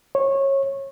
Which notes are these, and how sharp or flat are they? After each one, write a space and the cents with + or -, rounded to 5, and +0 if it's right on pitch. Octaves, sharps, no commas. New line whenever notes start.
C#5 -20